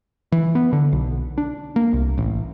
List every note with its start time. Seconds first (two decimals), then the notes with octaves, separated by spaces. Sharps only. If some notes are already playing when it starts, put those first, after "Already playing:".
0.32 E3
0.55 B3
0.73 D3
0.92 B1
1.38 D4
1.76 A#3
1.93 C2
2.18 A1